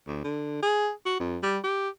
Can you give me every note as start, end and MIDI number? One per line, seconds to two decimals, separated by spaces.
0.07 0.22 38
0.24 0.59 50
0.63 0.91 68
1.06 1.15 66
1.20 1.38 41
1.43 1.58 55
1.64 1.89 67